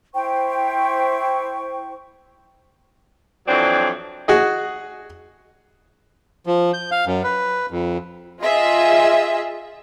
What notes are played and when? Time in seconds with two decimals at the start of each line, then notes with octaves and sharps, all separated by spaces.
0.14 E4 C5 G5 C#6
3.48 F2 E3 F#3 C4 D4 D5
4.28 F#4 G#4 D#5
6.46 F3
6.73 G6
6.91 F5
7.06 F#2
7.24 B4
7.71 F2
8.43 F4 G#4 D#5 E5